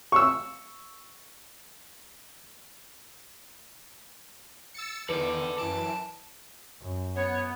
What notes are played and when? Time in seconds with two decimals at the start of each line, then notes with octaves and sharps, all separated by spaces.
0.12 C#6 E6
4.74 E6 A6 C#7
5.09 E2 D#3 A4 B4 D5
5.58 F#2 E3 A5 D7
6.82 F#2
7.16 B3 C#5